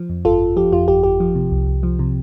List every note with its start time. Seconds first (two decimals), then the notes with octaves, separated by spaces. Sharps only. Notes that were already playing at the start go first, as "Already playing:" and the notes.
Already playing: F3
0.09 F2
0.25 G1 F4 A4
0.41 G1
0.56 F3 G4
0.72 F2 F4
0.88 G1 G4
1.03 G1 G4
1.20 F3
1.35 C3
1.52 C2
1.67 C2
1.83 F3
1.99 C3